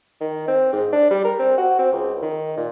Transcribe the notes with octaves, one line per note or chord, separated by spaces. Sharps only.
D#3
C4
G#2
D4
G3
A#4
C4
F#4
C4
C#2
D#3
A#2